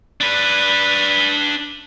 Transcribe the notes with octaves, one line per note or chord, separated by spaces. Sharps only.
D4 B4